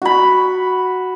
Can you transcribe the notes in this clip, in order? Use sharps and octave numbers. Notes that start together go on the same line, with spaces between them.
F#4 B5